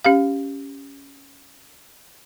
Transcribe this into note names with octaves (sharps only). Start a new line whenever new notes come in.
C#4 G4 F5